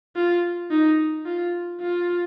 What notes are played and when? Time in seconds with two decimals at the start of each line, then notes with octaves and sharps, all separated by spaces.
0.16 F4
0.71 D#4
1.25 F4
1.80 F4